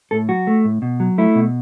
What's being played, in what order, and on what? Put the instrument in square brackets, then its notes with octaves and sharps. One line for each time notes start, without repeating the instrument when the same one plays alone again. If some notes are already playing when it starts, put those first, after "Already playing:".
[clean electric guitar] A2 A4
F#3 F#4
A3
A2
B2
F#3
A3 E4
B2